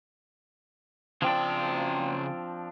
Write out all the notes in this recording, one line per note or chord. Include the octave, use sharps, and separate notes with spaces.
C#3 F3 C4 D4 G5